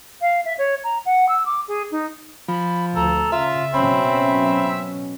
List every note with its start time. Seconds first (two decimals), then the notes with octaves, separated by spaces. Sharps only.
0.21 F5
0.45 E5
0.58 C#5
0.84 A#5
1.05 F#5
1.29 E6
1.45 D6
1.68 G#4
1.91 D#4
2.48 F3 B5
2.96 D2 A4 A#5
3.32 C#3 F4 E5
3.74 B2 F#3 C4 C#4 B5